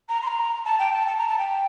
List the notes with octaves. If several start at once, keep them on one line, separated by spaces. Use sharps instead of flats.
A#5
C6
A#5
A5
G5
A5
A5
A#5
A5
G5